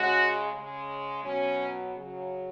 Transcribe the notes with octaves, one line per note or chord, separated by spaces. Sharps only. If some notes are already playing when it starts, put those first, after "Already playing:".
Already playing: C#3 G#3 F#4
C#3 G#3
B2 F#3 C#4
C#3 F#3